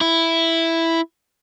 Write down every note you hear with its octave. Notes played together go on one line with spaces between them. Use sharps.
E4